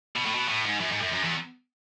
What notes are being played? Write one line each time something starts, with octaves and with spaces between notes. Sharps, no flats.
B2
A2
B2
A2
G#2
F#2
G#2
F#2
F#2
E2